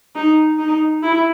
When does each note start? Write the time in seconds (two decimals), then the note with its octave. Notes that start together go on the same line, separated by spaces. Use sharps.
0.15 D#4
0.59 D#4
1.03 E4